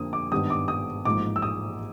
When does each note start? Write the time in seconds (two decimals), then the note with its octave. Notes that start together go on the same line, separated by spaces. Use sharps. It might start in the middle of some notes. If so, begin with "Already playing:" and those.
Already playing: F2 D3 F3 A#3 D#6
0.13 D6
0.31 G#1 G2 D#3 G3 B3 D#6
0.50 D6
0.68 D#6
1.05 A1 G#2 F3 A#3 D6
1.36 E6
1.42 D#6